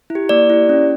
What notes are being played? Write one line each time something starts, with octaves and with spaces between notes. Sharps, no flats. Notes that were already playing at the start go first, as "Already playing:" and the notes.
E4
G4
A#3 D5
E4 G4
C#4